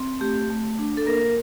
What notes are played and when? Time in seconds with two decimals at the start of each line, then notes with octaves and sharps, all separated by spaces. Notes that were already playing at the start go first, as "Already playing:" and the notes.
Already playing: C4
0.20 A3 G4
0.50 A3
0.79 D4
0.97 A4
1.06 A#3 A#4